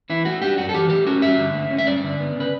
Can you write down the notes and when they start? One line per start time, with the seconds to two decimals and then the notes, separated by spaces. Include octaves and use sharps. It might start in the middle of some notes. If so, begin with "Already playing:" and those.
0.10 E3 E4
0.25 A3 F#4
0.42 D4 G4
0.58 F#2 F#4
0.69 A4
0.74 E3 G4
0.90 A3 G4
1.06 C#4 F#4
1.22 G2 E5
1.38 D3
1.54 A3
1.71 C#4
1.78 E5
1.87 G2 D5
2.04 D3
2.20 B3
2.36 C#3 B4